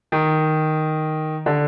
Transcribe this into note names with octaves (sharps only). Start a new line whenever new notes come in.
D#3
D3